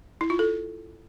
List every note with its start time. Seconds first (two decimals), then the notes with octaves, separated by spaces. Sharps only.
0.21 E4
0.30 F4
0.39 A4